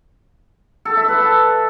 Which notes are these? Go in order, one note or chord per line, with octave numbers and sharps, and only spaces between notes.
A4
E5
B4
A5